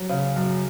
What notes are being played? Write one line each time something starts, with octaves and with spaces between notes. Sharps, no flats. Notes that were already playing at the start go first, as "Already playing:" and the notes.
Already playing: F#3
C#3
F#2